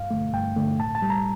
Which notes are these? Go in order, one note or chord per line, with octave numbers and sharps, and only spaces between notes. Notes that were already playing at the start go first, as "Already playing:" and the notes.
Already playing: G2 F5
D3 A3
G2 G5
D3 A3
A2 A5
A5
G3
A#5